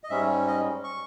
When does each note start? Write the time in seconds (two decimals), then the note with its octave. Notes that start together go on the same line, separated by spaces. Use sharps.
0.04 D#5
0.10 G#2 G3 C#4 E5
0.48 D#5
0.84 C#6